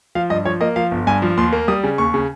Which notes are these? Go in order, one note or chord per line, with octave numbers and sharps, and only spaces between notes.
F3 F5
G2 D#5
F3 C#5
A#3 D#5
F3 F5
G1
G2 G#5
F3
D#2 C6
A#3
G3 D#6
C#3
D#2 C#6
C#3